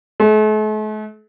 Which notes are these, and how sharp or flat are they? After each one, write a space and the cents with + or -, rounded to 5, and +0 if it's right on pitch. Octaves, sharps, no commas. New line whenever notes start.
A3 -45